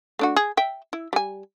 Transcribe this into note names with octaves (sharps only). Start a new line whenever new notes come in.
A3 D4 F#4
G#4
E5 G5
E4
G3 G#5